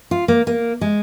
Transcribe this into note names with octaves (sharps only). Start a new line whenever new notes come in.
F4
A#3
A#3
G#3